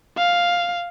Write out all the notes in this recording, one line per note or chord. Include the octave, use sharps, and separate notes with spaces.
F5